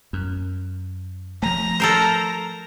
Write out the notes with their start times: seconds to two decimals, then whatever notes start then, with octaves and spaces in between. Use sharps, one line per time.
0.13 F#2
1.43 F3 A3 A#5
1.80 A4 A#4 C5